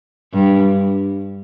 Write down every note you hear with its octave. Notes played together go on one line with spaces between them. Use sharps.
G2